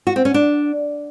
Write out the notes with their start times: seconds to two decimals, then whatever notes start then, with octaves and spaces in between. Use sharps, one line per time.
0.07 F#4
0.16 C4
0.25 C#4
0.34 D4